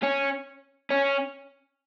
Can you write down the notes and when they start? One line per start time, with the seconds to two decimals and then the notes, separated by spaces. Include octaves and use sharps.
0.03 C#4
0.91 C#4